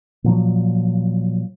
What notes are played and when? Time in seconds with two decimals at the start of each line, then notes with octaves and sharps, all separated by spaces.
0.24 A#2 F3 F#3